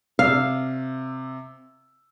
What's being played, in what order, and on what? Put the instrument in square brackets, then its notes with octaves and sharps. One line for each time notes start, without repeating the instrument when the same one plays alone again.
[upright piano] C3 E6 [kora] F5